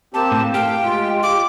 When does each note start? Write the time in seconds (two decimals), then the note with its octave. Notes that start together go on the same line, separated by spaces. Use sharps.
0.14 A#3 C4 G4 A5
0.32 A2
0.54 G4 F5 G5
0.83 G#3 F4
1.23 D6